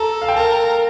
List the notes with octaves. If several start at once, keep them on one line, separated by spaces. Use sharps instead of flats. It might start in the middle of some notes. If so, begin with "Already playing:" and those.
Already playing: A4 A#5
F5
G5
A#4 A5